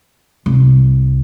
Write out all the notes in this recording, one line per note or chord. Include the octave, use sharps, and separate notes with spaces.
C2